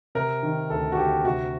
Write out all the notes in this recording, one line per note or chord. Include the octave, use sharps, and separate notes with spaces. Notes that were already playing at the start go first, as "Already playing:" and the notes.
C3 A#4
D#3
D2 A4
F#4
D2 G4
C3 F#4